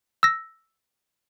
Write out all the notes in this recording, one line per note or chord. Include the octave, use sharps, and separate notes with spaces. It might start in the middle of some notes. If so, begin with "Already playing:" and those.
E6 A#6